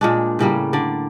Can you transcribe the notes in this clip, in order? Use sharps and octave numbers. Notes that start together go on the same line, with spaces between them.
A#2 G#3 D4
A2 C#3 G3 A#3
D3 D5